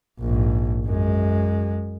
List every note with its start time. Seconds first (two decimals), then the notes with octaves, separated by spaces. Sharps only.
0.19 A#1 G#2
0.86 F#2 G#3